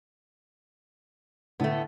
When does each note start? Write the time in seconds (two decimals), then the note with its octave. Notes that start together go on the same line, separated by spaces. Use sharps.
1.60 A2 D3 A3 B3